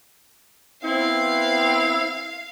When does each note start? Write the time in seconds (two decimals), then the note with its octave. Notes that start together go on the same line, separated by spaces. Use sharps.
0.84 B3 C4 E4 F5